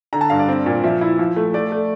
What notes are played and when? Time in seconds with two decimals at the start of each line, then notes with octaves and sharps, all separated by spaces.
0.13 D3 A#5
0.21 A5
0.30 G2 F5
0.39 D5
0.48 C4
0.66 A#2
0.84 F3 E5
1.01 E4
1.19 F3
1.36 A3
1.54 A3 D5
1.72 A3